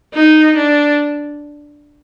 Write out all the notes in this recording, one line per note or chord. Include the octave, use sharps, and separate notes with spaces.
D#4
D4